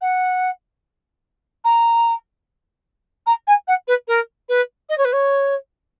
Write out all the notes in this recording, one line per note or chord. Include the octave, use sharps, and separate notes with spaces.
F#5
A#5
A#5
G#5
F#5
B4
A#4
B4
D#5
C#5
B4
C#5